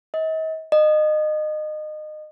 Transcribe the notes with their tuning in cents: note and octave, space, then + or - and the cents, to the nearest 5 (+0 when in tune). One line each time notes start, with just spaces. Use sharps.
D#5 +40
D#5 -25